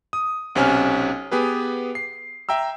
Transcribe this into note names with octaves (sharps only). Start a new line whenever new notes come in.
D#6
B1 C3 C#4 G#5 F6
B3 G4 G#4 B4
C7
E5 G5 A#5 E6